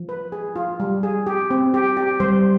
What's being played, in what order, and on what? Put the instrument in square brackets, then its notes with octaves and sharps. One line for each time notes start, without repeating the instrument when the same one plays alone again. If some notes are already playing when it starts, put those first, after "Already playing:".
Already playing: [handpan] F3
[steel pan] B4
G#4
F4
G3
G#4
G4
C4
G4
G4
[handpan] G3 [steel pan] C5